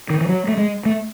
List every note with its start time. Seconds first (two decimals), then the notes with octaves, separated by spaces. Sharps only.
0.10 D#3
0.21 E3
0.29 F#3
0.48 A3
0.57 G#3
0.85 A3